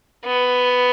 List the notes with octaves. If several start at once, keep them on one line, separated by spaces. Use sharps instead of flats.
B3